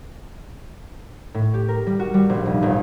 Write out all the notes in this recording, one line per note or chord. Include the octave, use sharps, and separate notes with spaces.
A2
G4
A#4
G3
F#4
G3
A#1
F1
G1